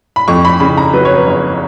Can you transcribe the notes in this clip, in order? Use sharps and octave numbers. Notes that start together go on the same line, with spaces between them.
B5
F2 C#6
B5
C#3 B5
A#5
F#3 B4
C#5
B4
F#1